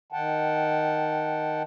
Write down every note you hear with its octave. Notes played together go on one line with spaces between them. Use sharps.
D#3 F#5 G5 A5